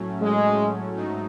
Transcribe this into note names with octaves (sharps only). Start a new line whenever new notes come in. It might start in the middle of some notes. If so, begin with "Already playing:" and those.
Already playing: A2 F#3 A3 C#4
G#3
G#2 F#3 A3 D#4